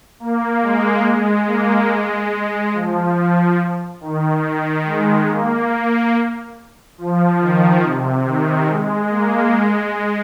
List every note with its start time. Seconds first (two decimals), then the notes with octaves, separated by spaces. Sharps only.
0.20 A#3
0.62 G#3
1.03 G#3
1.47 A#3
1.89 G#3
2.31 G#3
2.73 F3
3.16 F3
4.01 D#3
4.85 G#3
5.28 A#3
6.98 F3
7.41 D#3
7.83 C3
8.26 D#3
8.68 G#3
9.10 A#3
9.52 G#3